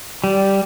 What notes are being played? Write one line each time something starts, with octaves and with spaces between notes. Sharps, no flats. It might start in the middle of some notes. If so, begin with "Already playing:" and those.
G3